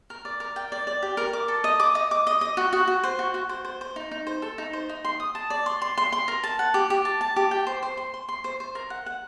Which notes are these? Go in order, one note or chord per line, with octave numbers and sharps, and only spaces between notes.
A#4
D5
A#4
G5
D5
D5
G4
A#4
D6
A4
D#5
D6
D#5
D6
D#5
D#5
F#4
F#4
F#4
C5
F#4
F#4
C5
C5
C5
D#4
D#4
C5
A4
D#4
C5
D#4
C6
D#6
A5
D5
C6
C6
C6
C6
A#4
A5
F#5
G4
G4
A5
A5
G4
G5
C5
C5
C6
C6
C6
C5
C5
A#4
F#5
F#5